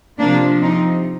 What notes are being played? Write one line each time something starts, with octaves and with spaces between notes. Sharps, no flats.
C3 F3 A#3 D4
C4 D#4